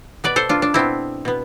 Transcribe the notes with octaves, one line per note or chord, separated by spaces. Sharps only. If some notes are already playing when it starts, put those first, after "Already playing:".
B2 B3 B4 D5
A4 C5
D4 F4
D4
B2 B3 C4 E4
B2 B3